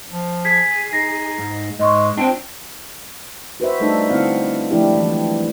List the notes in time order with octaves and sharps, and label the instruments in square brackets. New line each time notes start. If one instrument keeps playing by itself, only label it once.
[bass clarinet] F3
[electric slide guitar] G#4 [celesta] G#6 B6
[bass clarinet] D#4 [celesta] A#6 C7
[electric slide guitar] G#2
[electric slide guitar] G#2 [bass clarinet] G#3 [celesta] D#5 C6 C#6
[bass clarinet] C4 [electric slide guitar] D4 G5 [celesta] F4 C5
[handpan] F#4 B4 C5 E5
G3 A3 D4 D#4 F4 A4
D3 B3 C4 E4 F5 F#5
F3 G#3 A3 D4 E4 G4
E3 G3